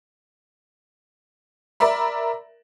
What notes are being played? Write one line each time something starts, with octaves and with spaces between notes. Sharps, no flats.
A#4 D5 E5 B5